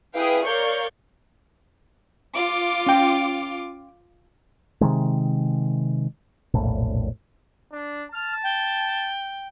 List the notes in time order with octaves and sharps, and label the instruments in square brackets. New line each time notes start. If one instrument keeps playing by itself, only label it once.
[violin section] E4 G#4 B4 F5 G5 D#6
A#4 C#5 D5 F5 C#6 G6
F4 D6
[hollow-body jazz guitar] C#4 G5
[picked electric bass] C3 D#3 G#3
E1 A#1 A2
[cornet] D4
[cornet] A5 [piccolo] F6
[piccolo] G5